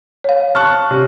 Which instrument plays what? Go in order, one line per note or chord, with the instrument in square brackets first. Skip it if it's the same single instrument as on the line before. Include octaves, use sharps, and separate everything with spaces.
[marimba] C#5 F5
[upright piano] A5 C#6 F#6 [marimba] F6
[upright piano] C3 C#4